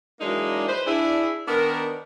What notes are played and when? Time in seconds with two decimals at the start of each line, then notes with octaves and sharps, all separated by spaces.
0.21 E3 F#3 G#3 A#3 D4 D#4
0.68 B4 C5
0.86 D4 E4 G#4
1.48 D#3 B3 D4 A#4